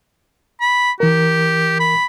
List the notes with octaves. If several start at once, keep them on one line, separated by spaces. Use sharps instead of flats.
B5
E3 G4 A#4
B5